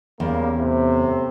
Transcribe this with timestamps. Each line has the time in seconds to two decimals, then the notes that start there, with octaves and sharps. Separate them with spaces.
0.20 E2 C#3 G3 A#3
0.57 A2 C3